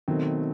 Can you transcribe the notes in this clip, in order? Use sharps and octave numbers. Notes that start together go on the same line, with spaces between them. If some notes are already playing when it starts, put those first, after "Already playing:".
B2 D#3 F#3 A3 C4